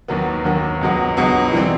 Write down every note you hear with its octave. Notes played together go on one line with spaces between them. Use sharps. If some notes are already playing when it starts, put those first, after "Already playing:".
D#2 D#3 F#3 B3
D#2 D#3 F#3 B3
C#2 B2 F#3 B3
C#2 B2 F#3 B3
E3 G3 C4